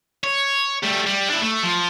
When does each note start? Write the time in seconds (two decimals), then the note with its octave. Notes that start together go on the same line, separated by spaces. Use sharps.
0.24 C#5
0.83 G3 A3
1.07 G3
1.30 D4 E4
1.42 A3
1.63 F3